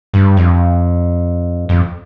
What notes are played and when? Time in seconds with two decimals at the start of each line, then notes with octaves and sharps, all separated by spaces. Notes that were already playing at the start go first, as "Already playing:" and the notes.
0.14 G2
0.37 F2
1.69 F2